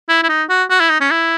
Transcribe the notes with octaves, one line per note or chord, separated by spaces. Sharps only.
E4
E4
D#4
F#4
F#4
E4
D#4
C#4
E4